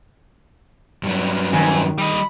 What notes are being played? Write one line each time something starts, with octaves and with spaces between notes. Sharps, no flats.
G2 F#3
F2 D#3 G#5
G3 D#5 B5